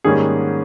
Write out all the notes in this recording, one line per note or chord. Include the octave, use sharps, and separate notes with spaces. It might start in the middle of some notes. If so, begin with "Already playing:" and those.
G#2 D#3 G3 A#3 C#4 G#4